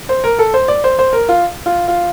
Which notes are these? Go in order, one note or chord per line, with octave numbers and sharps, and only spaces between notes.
C5
A#4
A4
C5
D5
C5
C5
A#4
F4
F4
F4